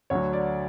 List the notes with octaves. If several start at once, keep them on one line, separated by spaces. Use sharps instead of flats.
D2 D3 F#3 C#5
D5